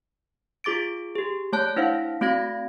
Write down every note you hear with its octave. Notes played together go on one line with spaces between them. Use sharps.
F4 G#4 D6 A6 D7
G4 G#4
A3 C#5 A5 F#6 G6
D4 E4 C5 F5 F#5
A3 C4 F#4 F5 G#6 A#6